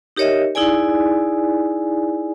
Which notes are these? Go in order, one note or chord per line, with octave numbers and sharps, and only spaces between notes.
D#4 G4 A#4 C#5 D#5 E5
D#4 E4 G#4 D5 G#5